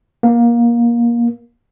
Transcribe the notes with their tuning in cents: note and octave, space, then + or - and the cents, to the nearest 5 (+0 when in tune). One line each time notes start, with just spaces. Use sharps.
A#3 +20